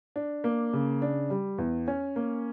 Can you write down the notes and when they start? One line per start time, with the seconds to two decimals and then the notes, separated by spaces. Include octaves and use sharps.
0.16 D4
0.44 A#3
0.73 C#3
1.02 D4
1.30 G3
1.58 E2
1.88 C#4
2.16 A#3